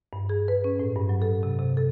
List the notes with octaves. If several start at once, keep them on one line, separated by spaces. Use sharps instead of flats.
G2
G#4
B4
C#4
A2
G2
F#3
A4
C3
C3
A4